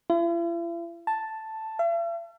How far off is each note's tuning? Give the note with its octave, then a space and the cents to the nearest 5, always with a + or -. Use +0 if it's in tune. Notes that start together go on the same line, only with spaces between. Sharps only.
E4 +45
A5 +0
E5 +45